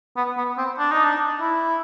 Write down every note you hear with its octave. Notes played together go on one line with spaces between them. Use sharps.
B3
B3
C4
D4
D#4
D4
E4